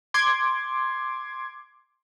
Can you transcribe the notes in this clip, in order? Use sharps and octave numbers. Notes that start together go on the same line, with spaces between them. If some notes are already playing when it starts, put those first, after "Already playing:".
C6 D6 G#6